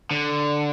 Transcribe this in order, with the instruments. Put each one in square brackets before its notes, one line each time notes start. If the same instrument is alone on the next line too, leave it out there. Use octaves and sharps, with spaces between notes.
[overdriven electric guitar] D3